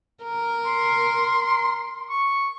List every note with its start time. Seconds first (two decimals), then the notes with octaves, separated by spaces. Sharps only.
0.23 A#4
0.66 C6
2.09 C#6